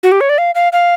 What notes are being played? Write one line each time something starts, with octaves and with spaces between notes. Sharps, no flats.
F#4
G4
C#5
D5
F5
F5
F5